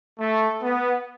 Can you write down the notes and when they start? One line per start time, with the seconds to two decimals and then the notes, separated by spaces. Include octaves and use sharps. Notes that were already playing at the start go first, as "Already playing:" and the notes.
0.19 A3
0.62 B3